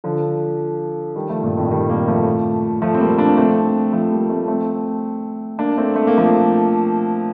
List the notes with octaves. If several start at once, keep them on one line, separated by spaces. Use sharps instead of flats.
D3 F3
D#3 G3
F3 A3
G2 A#2
F2 A2
D#3 G3
G3 A#3
F3 A3
F3 A3
C4
G3 A#3
A#3 D4
A3 C4
F3 A3
G3 A#3
A3 C4
A3 C4
A#3 D4
A3 C4
A3
A#3
F3 A3